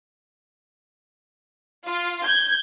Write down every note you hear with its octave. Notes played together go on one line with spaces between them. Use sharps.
F4
G6 G#6